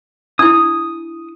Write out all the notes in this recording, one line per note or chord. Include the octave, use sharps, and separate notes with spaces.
D4 E4 D#6